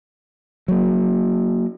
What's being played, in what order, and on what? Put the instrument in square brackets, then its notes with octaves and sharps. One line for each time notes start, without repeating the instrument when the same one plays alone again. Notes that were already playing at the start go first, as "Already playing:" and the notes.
[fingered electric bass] F#3 A#3